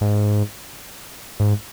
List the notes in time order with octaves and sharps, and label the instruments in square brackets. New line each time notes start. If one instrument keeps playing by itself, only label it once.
[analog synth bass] G#2
G#2